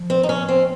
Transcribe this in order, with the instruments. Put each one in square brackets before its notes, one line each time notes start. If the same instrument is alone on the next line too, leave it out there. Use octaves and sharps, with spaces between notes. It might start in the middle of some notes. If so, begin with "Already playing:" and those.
Already playing: [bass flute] F3
[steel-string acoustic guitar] C4
D#4
C#4
C4